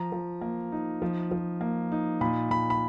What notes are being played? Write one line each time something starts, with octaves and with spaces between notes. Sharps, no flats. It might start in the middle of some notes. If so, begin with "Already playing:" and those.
Already playing: F3 A#5
F3
A#3
D#4
F3
F3
A#3
D#4
A#2 B5
A#2 B5
B5